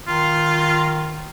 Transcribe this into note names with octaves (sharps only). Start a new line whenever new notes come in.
D#3 F4